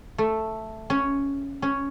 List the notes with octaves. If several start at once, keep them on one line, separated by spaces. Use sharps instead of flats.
A3
C#4
C#4